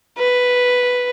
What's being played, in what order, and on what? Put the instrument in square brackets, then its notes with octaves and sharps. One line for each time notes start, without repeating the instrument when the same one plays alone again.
[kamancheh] B4